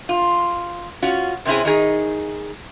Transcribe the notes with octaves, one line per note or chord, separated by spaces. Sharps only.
F4
C#4 F4 F#4
C3 C4 C#4 E4 G#4
D#3 D#4 G#4